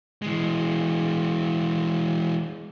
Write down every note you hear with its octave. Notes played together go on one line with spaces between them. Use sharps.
E3 G#3